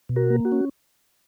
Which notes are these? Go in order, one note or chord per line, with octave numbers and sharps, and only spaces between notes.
B2
F#4 A#4
A#3
F#4
C#4